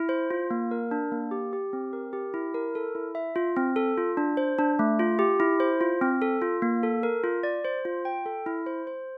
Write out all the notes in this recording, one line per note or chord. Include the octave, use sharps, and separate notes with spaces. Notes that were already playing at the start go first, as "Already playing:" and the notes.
Already playing: E4
C5
F4
A#3
A#4
D4
A#3
G4
G4
C4
A#4
G4
E4
A#4
A4
E4
E5
F4
C4
A4
F4
D4
C5
D4
A3
F4
G4
E4
C5
F4
C4
A4
F4
A#3
A4
A#4
F4
D5
C5
F4
G5
A4
E4
C5
C5